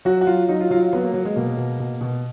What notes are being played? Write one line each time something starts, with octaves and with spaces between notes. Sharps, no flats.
F#3 F#4
F#4
F#3 F4
F#3 D#4
F4
F#3 F4
F#3 B3
A#3
F#3
G#3
B2 A#3
B2
B2
B2